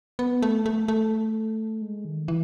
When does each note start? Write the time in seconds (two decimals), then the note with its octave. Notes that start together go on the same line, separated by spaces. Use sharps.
0.19 B3
0.42 A3
0.66 A3
0.88 A3
1.82 G#3
2.05 D#3
2.28 E3